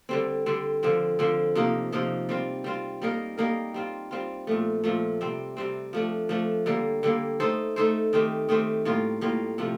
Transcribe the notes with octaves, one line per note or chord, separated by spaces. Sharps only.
D3 G3 C4
D3 G3 C4
D3 F3 C4
D3 F3 C4
C3 F3 A#3 D#4
C3 F3 A#3 D#4
G3 C4 F4
G3 C4 F4
G3 A#3 D#4 A#4
G3 A#3 D#4 A#4
G3 C4 F4
G3 C4 F4
A#2 F3 A3
A#2 F3 A3
C3 G3 C4
C3 G3 C4
F3 A3 D4
F3 A3 D4
D3 G3 A#3
D3 G3 A#3
A3 D#4 A4 C5
A3 D#4 A4 C5
D#3 A3 C4 G4
D#3 A3 C4 G4
A2 G3 A#3 F4
A2 G3 A#3 F4
C3 F3 A3